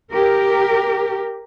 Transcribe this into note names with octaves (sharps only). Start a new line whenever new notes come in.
G4 A#4